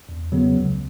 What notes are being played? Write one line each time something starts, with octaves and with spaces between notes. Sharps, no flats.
E2
C#3 F#3 B3
C#2